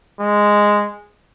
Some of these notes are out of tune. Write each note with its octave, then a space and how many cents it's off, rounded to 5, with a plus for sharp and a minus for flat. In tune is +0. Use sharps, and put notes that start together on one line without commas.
G#3 -5